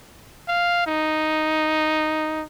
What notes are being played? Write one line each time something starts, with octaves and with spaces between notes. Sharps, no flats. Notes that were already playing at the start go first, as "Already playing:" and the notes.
F5
D#4